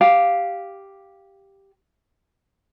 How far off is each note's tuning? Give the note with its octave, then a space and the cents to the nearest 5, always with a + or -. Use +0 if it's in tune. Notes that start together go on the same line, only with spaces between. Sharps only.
G4 +0 F5 +0